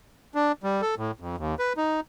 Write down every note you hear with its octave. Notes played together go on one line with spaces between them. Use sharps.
D4
G3
A4
A2
F2
D#2
B4
D#4